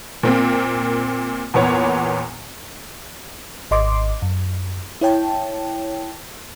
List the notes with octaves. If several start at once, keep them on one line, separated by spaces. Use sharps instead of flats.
A#2 A#3 C4
E2 A#2 B3 C#5
G#1 D#5 C6 D6
F#2
E4 C#5 G5 A5